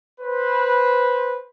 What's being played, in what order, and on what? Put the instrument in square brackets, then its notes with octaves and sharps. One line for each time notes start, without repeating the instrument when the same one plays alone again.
[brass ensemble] B4 C5